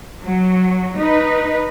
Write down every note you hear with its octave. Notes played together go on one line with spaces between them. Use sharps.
F#3
D#4 B4